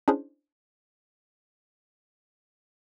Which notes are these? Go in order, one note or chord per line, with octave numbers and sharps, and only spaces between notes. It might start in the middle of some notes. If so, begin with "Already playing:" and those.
C#4 D4 E4 G#4 C5